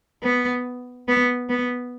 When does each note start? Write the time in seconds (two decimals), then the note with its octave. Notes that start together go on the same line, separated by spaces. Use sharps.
0.23 B3
1.08 B3
1.49 B3